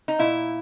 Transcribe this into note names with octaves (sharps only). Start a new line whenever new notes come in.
D#4
A#2 E4